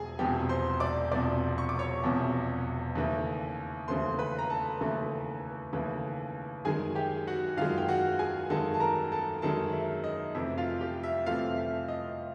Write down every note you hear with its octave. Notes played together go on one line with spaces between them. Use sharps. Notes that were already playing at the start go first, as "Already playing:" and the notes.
Already playing: E1 E2 F3 G#4 G#5
E1 E2 C3 F3 G4 G5
C5 C6
D5 D6
E1 E2 C3 F3 D5 D6
C#6
D6
C#5 C#6
E1 E2 C3 F3
D#2 C#3 E3 A3
D#2 C#3 E3 A3 C5 C6
B4 B5
A#5
A4 A5
D#2 C#3 E3 A3
D#2 C#3 E3 A3
F#2 D#3 G#3 G#4 G#5
G4 G5
F#4 F#5
F#2 D#3 G#3 F4 F5
G5
F#4 F#5
G#4 G#5
F#2 D#3 G#3 A4 A5
A5
A#4 A#5
A4 A5
F#2 D#3 G#3 A4 A5
E5
D#5
F2 C3 E3 A3 E5
F4 F5
G4 G5
E5
F2 C3 E3 A3 F4 F5
E5
D#5